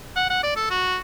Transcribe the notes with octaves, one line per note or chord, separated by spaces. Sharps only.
F#5
F#5
D5
A4
F#4